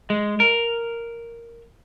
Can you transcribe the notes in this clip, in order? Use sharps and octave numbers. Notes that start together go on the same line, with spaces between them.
G#3
A#4